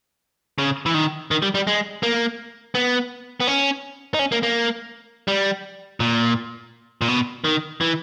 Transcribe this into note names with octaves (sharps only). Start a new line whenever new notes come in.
C#3
E3
D#3
D#3
G3
G3
G#3
A#3
B3
B3
C#4
D#4
C#4
A#3
A#3
G3
A#2
A#2
B2
D#3
E3